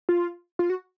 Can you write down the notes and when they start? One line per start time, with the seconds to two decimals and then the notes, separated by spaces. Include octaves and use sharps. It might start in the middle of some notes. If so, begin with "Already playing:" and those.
0.09 F4
0.59 F4
0.70 F#4